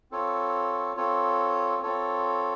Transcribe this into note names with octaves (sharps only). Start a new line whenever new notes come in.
C4 F4 A4 C#5
C4 F4 A4 C#5
C4 F4 A4 C#5